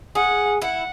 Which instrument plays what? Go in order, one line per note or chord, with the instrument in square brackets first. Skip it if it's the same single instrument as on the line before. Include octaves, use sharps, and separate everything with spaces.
[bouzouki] G#4 [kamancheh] F#5
[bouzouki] E4 [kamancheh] F#5